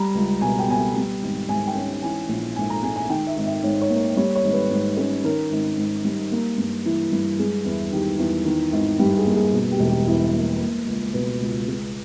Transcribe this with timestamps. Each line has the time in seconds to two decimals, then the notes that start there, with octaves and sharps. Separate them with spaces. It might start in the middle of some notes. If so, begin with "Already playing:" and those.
Already playing: G3 A#5
0.15 C#2
0.41 B2 G#5
0.59 G5
0.68 B3 G#5
0.78 G5
0.96 G3
1.23 G#1
1.49 G#2 G#5
1.67 G5
1.75 C#4
2.02 E3 G#5
2.29 A#1
2.56 G#2 G#5
2.70 A#5
2.83 G#3 G#5
2.96 G#5
3.09 D#3 G5
3.27 E5
3.37 G#1
3.45 E5
3.63 G#2 C#5
3.82 C#5
3.90 A#3
4.17 G3 C#5
4.35 C#5
4.44 G#1
4.53 B4
4.71 G#2
4.97 C#4
5.24 D#3 A#4
5.52 G#1
5.77 G#2
6.04 G3
6.32 A#3
6.58 G2
6.85 E3
7.12 G2
7.38 G#3 G#4
7.65 E2 E4
7.92 D#3 G4
8.19 E2
8.45 D#3
8.72 G#1
8.99 G2 G4
9.17 G#4
9.26 A#3
9.35 G#4
9.53 B2
9.72 G4
9.79 E1
9.89 G4
10.07 E2 E4
10.34 A#3
10.61 A#3
10.87 C#2
11.14 B2 B4
11.41 C#2
11.67 G#3